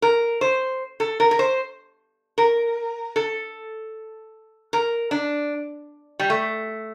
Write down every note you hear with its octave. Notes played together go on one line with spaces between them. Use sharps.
A#4
C5
A4
A#4
A#4
C5
A#4
A4
A#4
D4
G3
A3